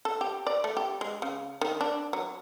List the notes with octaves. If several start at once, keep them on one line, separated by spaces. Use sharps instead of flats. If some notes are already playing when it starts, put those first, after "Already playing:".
A4
G4
D5
A3
G4
G#3
C#3
D#3
D4
F#3